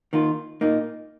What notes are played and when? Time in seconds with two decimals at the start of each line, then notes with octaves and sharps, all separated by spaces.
0.13 D#3 A#3 F4
0.61 A#2 A#3 D#4